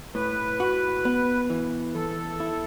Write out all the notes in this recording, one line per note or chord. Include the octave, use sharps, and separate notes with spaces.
A2 B4
F#4
B3
E3
E2 A4
E4